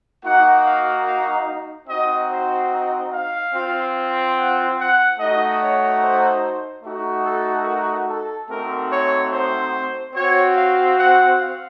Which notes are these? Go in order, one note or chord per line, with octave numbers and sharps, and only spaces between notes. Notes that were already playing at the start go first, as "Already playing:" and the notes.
A#3 D#4 F#4 F#5
F5
F5
C4 D#4 F#4 D#5
C5
D#5
F5
C4 F4
F#5
F#5
A3 D#4 F#4 D#5
C#5
C5
A3 D#4 F#4
A4
A#4
A4
A3 C4 D#4 F#4 A#4
C#5
C5
C4 F#4 C#5
F5
F#5
F5